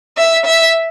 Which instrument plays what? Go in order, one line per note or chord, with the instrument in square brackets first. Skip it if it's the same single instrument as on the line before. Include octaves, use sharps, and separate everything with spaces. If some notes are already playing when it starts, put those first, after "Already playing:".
[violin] E5
E5